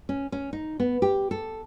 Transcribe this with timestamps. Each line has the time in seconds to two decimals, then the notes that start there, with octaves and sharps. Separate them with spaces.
0.09 C#4
0.32 C#4
0.53 D#4
0.80 B3
1.02 G4
1.31 A4